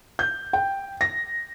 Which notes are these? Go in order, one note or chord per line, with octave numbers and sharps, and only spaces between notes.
G6
G5
A#6